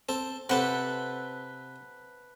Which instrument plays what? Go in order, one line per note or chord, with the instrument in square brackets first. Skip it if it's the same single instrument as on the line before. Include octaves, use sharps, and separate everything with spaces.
[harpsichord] C4 A4
[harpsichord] C3 C4 G4 [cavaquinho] A4 B4 F#5